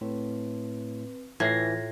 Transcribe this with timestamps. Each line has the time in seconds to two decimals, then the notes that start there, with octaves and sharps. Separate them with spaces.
0.01 A2 C4 B4
1.40 A2 E3 F4 G#6 A#6 C7